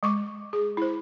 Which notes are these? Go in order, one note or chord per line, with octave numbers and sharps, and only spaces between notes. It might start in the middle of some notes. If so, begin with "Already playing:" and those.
G#3 C#6 D6
G#4
E4 C5